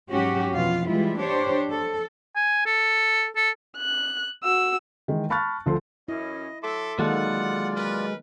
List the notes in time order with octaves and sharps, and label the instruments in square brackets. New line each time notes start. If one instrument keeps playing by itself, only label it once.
[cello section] G#2 F#3 C#4 F#4 G4
F2 B2 E3 F4 F5
E3 G3 G#3 E4 F4
D4 G4 C5 C#5
A4
[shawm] G#5
A4
A4
[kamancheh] F#6
F#4 E6
[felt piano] D#3 E3 G#3
A5 B5 C#6 F6 F#6 A6
D2 F3 A4 C6
[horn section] F#2 C#4 [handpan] E4 [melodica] D#5
[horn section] F#3 A4 [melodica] E5 C6 D6
[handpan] D#3 A#3 A4 [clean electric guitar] F#3 G#3 [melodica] F4 D5 [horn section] F#5
[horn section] A#4 B4